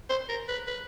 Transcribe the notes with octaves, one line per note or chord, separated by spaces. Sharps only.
C5
A#4
B4
B4